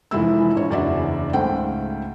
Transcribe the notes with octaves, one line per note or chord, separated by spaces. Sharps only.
F1 E3 F3 G#3 E4 E6
A#1 C#5
F#1 E2 D4 F#4 D5 E5
C#2 G#2 A3 C5 F#5 G5